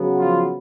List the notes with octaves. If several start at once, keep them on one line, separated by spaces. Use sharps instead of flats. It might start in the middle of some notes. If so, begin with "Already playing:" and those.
Already playing: C#3 F#3 B3
F3 F4